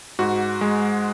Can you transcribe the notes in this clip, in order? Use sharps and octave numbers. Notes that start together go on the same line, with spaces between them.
G#2 F#4
G#3